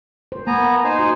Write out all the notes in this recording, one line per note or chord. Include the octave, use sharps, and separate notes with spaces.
C5
A#3 B3 G#5 A#5
D#4 C5 G#5
F#4